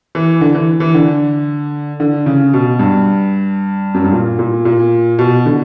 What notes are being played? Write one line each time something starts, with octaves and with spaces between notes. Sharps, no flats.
E3
D3
E3
E3
D3
D3
C#3
B2
G2
F#2
G2
A#2
A#2
A#2
B2
D3